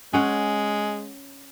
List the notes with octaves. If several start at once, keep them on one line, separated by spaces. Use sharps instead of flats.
G#3 C#4 F#5